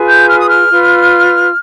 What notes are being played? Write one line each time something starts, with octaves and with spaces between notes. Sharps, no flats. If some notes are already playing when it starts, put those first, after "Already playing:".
Already playing: F4 G#4 B4
G6
F6
D#6
F6
F4 B4